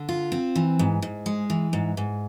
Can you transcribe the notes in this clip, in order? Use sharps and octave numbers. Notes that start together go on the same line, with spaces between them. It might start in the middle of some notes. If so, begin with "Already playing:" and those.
Already playing: D3
F4
C4
E3
G#2
G#2
G#3
E3
G#2
G#2